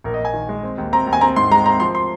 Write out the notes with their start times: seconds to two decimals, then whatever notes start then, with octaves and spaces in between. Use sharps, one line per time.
0.04 A#1 A#4
0.14 D#5
0.20 A#1 G#5
0.34 D#3
0.49 G#3
0.63 C4
0.78 D#2
0.93 C4 A#5
1.07 D#2
1.13 G#5
1.21 C4 A#5
1.36 G#2 C6
1.51 G#3 A#5
1.65 C4 A#5
1.80 F3 C6
1.95 C6